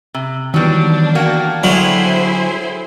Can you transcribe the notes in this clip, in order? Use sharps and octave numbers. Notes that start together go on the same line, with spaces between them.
C3
D#3 E3 F#3 G3 B3 D4
A#3 F#4 G5 A5 G#6
D3 F#3 E4 G#4 C5